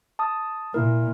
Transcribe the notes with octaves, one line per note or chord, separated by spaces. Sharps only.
A5 D#6
A#2 E4 A#4